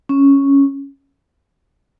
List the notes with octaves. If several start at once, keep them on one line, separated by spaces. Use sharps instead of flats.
C#4